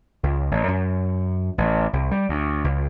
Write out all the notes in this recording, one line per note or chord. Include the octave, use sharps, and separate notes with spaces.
C#2
A1
F#2
A1
C2
G3
D2
C#2